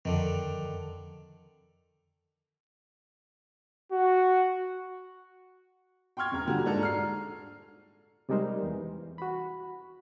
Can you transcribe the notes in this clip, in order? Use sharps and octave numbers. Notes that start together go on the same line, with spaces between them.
F2 D3 D#3
F#4
G5 C6 C#6 F6 G#6
E1 A#5
A#2 D3 G3 F#4
G#2 D4 A4 A#5
F6 C7
C3 G3 G#3 D#4 A#4 C5
E2 E3
F#4 B5